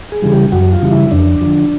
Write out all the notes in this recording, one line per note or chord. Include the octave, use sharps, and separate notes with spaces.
G#4
C#3 E3 G3
G4
F#2 F#4
F4
C#3 E3 G3
E4
F2 D4
D3 F3